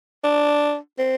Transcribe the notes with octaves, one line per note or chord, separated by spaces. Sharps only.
D4
C4